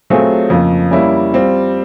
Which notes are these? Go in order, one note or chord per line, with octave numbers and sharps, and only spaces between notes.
F#3 A3 C4 F4 G#4
F2 C#3 F3 A#3
G3 A#3 C#4 E4
G3 C4 F4